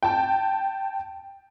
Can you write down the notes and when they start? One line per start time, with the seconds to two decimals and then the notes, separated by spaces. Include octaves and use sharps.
0.03 G5 A5